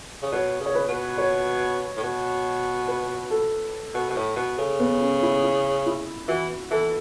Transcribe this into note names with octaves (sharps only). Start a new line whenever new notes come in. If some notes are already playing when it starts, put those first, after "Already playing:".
C#3
B2 C#5
C#3
C#5
B4
B2
C#5
A2
B2
B4
A4
B2
B2
A2
B2
C#3 A4
B3
C#4
E4
E4
E4
E3 F#4
E3 A4